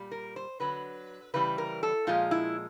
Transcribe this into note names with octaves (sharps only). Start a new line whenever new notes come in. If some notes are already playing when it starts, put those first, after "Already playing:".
Already playing: A#2 G3
A#4
C5
D3 F#3 B4
C#3 E3 G3 B4
A#4
A4
A#2 F3 G#3 F4
E4